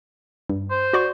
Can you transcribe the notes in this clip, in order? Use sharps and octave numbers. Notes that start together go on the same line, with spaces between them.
G2
C5
F#4 D5 C#6